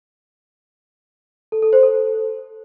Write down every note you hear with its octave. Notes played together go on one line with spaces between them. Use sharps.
A4
A4
C5
A4